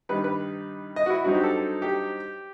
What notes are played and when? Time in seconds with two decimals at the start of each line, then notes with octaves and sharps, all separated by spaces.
0.09 G2 D#3 G3 D#4 B4
0.24 B4
0.96 D#5
1.06 F#4
1.10 E4
1.24 G2 F#3 C4 D#4 F#4
1.35 G4
1.44 A4
1.82 G4